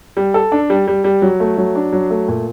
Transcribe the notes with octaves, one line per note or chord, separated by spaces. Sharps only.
G3
A4
D4
G3
G3
G3
F#3
A3
F#3
D4
F#3
A3
A#2